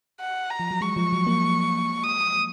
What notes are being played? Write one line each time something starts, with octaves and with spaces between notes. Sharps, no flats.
F#5
A#5
F3
F#3
G#3 C#6
F3
F#3
A#3
D#6